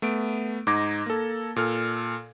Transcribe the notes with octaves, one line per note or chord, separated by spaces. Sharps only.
A3 B3 D7
G#2 D#4 D6 G#6 A#6
A#3 A4
A#2 A4 F6